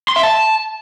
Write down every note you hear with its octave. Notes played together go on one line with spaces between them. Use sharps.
C6
E5
A5